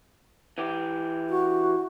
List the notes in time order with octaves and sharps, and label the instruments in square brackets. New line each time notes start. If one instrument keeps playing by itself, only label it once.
[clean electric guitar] E3 G4
[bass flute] F#4